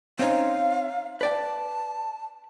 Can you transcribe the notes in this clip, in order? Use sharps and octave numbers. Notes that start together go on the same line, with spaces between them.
C4 C#4 D#4 F5
B4 D5 G5 A5